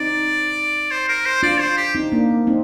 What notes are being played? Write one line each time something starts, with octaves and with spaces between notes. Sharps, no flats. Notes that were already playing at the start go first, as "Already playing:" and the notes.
Already playing: C4 D#4 D5
C5
A#4
C5
D4 F4 D5
C5
G4
C4 D#4
A#3 D4
C4 D#4